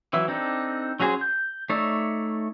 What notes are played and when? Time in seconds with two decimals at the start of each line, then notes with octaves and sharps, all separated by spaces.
0.13 E3 F#3 E4
0.28 C4 D4 D#4 A4
1.00 F#3 C#4 F#4 G#4 C5
1.21 G6
1.69 A3 D#4 C#5 D5 E5